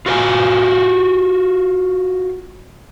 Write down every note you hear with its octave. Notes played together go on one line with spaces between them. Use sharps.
F4 F#4 A#4 F5 G#5